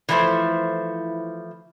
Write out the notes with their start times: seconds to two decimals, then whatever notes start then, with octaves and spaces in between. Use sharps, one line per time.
0.09 E3 F3 A3 E4 C5